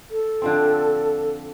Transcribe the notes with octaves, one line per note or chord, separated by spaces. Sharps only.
A4
D3 F3 C4